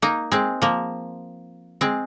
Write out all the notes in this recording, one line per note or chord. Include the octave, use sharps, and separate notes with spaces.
A#3 D#4
G#3 C4
F3 A#3
G#3 C4